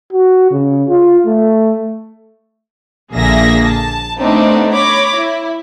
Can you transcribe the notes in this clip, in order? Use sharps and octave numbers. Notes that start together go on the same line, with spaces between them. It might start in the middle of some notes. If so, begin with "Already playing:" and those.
F#4
C#3
F4
A3
A#1 D3 A#3 G#4 E5 A#6
A5
A3 B3 C4 D4 D#4
C#5 B5 D6 A#6
E4